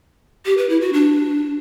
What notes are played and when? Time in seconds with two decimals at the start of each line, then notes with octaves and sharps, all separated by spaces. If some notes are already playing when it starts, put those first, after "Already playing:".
0.46 G4
0.57 B4
0.69 E4
0.81 F#4
0.93 D4